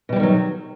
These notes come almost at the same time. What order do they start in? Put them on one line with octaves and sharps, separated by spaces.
B2 G3 E3 D#3 F#3